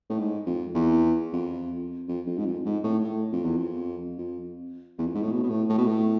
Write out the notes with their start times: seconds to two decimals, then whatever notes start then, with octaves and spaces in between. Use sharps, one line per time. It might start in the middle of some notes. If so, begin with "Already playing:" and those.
0.10 A2
0.19 G#2
0.46 F2
0.75 E2
1.33 F2
2.08 F2
2.27 F2
2.38 G#2
2.46 F2
2.65 G#2
2.84 A2
3.04 A2
3.32 F2
3.44 E2
3.57 F2
4.18 F2
4.98 E2
5.07 F2
5.15 G#2
5.23 A2
5.32 B2
5.43 B2
5.50 A2
5.69 A2
5.78 B2
5.87 A2